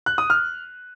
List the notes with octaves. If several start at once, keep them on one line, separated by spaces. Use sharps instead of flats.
F#6
D#6
F6